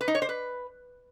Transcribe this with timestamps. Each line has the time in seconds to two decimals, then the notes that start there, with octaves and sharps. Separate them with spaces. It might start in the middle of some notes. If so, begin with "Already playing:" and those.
0.01 B4
0.08 D#4
0.15 C#5
0.22 C5
0.29 B4